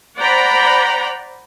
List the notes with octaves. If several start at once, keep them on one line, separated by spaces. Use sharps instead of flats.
C5 D5 F#5 G5 A#5 B5